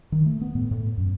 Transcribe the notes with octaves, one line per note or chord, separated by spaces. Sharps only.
D#3
A3
B3
A2
A2
F#2